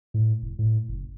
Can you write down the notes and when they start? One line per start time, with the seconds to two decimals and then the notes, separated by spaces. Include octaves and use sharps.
0.14 A2
0.42 F1
0.59 A2
0.89 F#1